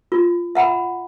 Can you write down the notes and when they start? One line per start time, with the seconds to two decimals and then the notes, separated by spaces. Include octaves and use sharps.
0.12 F4
0.55 E5 F#5 A#5 B5